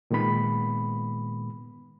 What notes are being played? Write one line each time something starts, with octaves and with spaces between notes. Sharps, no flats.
A#2 D#3 G#3 B3 B5